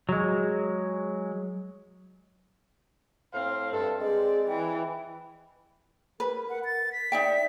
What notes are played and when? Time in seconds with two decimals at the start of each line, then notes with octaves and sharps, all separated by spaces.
0.09 F#3 G#3
3.34 A2 C4 F5
3.72 G2 A4
4.01 G#3 C4 G#4 D5
4.48 E3 G5
6.20 A#4 B4
6.50 F#5
6.65 A6
6.92 B6
7.12 D#4 D5 E5 G5